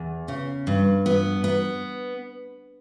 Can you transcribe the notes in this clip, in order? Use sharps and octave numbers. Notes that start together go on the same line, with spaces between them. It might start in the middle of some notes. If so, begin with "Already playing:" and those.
Already playing: E2
C#3
G2
B3
B3